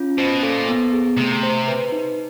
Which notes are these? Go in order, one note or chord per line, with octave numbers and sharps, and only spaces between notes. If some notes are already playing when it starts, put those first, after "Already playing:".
Already playing: C#4 F4
B2 C5
A#2 A4
B3
G#4
C3 A3
C5
B4
D#4